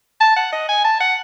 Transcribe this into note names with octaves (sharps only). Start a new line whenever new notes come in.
A5
F#5
D#5
G#5
A5
F#5